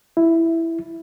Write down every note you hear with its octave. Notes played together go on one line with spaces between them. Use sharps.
E4